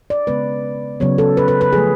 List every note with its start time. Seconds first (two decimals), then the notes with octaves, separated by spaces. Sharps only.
0.10 D5
0.27 C#3 G#3 B3 B4
1.00 C#3 F#3 B3 C#5
1.18 A4
1.37 B4
1.48 B4
1.61 B4
1.73 F3 A3 G#4